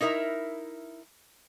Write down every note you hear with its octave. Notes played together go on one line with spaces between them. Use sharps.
D#4 E4 A#4 E5